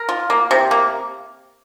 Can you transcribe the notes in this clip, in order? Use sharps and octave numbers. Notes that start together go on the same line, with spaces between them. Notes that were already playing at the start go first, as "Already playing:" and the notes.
Already playing: A#4
F4
A#3
C3
A#3